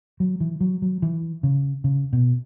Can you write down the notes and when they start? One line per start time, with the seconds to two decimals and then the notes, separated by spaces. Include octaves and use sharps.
0.20 F#3
0.40 E3
0.61 F#3
0.82 F#3
1.02 E3
1.43 C#3
1.84 C#3
2.13 B2